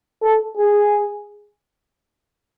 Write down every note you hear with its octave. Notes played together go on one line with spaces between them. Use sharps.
A4
G#4